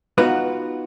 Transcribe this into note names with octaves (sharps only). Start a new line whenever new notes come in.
B3 D#4 F4 F#4 B4